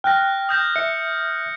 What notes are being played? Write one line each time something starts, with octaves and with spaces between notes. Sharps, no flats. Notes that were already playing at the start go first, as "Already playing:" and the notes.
G5 F6 F#6 A#6
D#6 G6 A#6
E5 C#7